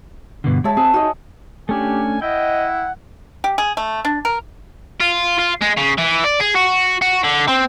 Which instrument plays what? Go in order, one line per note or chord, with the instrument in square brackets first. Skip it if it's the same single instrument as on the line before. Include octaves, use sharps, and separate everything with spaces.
[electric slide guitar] G2 B2 D3
[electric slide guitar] G#3 [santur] C#5 E5 A5
[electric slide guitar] C4 [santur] G#4
[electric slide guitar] D#4 [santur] F#4 D#5
[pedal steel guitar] A3 C#4 D4 [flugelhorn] G4 [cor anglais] G#5
[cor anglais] E4 [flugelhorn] D#5 [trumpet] F#5 [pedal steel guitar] G5
[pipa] G4
G#4
A3
D4
A#4
[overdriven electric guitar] F4
F4
G#3
C#3
E3
D5
G#4
F#4
F#4
D3
C4